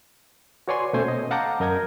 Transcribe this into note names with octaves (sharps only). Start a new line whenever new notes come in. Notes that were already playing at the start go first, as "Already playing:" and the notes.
F#4 B4 C#5 D5 G#5 C6
B2 A3 C#4 C5 G#5 G6
D#5
F5 F#5 A5 A#5 D6 G6
F#2 A#4 D#5 G6 G#6